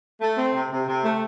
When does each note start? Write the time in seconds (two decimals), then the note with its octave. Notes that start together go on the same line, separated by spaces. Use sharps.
0.21 A3
0.38 C4
0.55 C3
0.70 C3
0.87 C3
1.03 A3